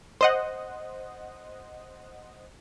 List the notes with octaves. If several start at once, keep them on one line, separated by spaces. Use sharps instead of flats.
C5 D#5 F#5